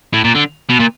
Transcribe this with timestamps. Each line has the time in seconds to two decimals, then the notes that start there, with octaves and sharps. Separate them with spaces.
0.13 A2
0.24 A#2
0.35 D3
0.70 B2
0.80 A#2